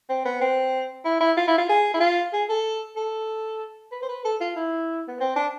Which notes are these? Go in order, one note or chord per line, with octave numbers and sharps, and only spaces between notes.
C4
B3
C4
E4
E4
F4
E4
F4
G#4
E4
F4
G#4
A4
A4
B4
C5
B4
A4
F4
E4
B3
C4
D4